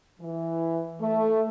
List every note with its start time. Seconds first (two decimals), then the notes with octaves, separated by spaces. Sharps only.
0.20 E3
1.00 A3